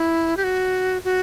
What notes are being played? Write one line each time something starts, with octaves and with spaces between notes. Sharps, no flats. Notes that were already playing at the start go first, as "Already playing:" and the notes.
Already playing: E4
G4
F#4
F#4